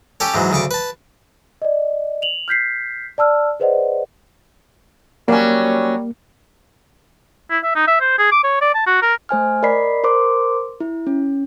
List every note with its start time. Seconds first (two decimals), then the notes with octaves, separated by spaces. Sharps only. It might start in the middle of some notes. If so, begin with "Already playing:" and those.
0.20 C#4 G4 A4 C#5
0.34 G#2 E3 F#3
0.52 D2 C#3 C#6 D6
0.71 B4 A5
1.62 D5 D#5
2.22 F7 F#7
2.48 F6 G6 B6 C7
3.18 D5 A5 E6 F6
3.60 G#4 B4 C5 D5 D#5 F#5
5.28 F#3 G3 A#3 C#4
7.50 E4
7.64 E5
7.75 D#4
7.88 E5
8.01 C5
8.19 G#4
8.32 D6
8.44 C#5
8.62 D5
8.75 A5
8.87 F#4
9.02 A#4
9.29 A3 C5 G#5 F6
9.63 A#4 D5 D#5 B5 B6 C7
10.04 A#4 C5 C6 D6
10.80 E4
11.07 C#4